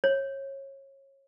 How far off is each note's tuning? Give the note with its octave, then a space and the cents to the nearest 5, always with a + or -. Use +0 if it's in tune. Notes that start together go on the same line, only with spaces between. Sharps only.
C#5 -25